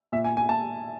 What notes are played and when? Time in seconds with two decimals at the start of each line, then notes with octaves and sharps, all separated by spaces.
0.12 A#2 E5
0.24 G#5
0.37 G#5
0.49 A#2 A5